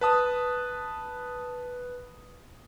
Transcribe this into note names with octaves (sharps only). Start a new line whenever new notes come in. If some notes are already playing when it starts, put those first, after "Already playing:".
B4 A5 D#6